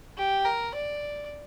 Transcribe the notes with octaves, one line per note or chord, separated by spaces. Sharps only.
G4
A#4
D5